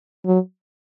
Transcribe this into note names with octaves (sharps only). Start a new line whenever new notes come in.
F#3